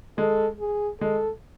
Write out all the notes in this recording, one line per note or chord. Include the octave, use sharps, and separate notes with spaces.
G#3 A4
G#4
G#3 A4